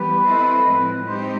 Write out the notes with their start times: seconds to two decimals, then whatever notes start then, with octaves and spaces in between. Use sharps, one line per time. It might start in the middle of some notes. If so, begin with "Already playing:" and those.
Already playing: E3 G3 B3 G4 B4
0.25 C4 E4 A4 C5 D#5
0.66 A2 F3 G#3 C4
1.07 G#3 C4 D#4 G4 C5